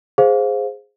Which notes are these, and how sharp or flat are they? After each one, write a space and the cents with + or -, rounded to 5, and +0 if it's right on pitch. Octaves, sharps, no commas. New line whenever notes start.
G#4 -5 C5 +0 F5 +15